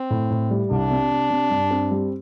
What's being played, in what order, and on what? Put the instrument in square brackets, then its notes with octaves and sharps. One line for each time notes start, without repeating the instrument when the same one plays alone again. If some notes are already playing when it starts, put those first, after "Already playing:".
Already playing: [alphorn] C4
[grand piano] A2
A2
G3
[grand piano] C2 [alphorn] D4
[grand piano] C3
C3
C3
G2
C4
G3